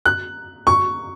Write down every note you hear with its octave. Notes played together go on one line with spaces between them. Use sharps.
F#6
C#6